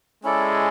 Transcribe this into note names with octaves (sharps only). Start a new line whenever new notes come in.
G#3 C#4 E4 A4 D5